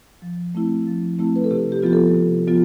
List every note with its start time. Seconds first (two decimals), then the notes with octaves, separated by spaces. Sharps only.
0.22 F3
0.55 A3 C4 E4
0.87 F3
1.19 A3 C4 E4
1.36 B4
1.44 A4
1.51 C3 G4
1.72 G4
1.82 F3 B3 F4 G4
1.93 A4
2.15 C3
2.47 F3 B3 F4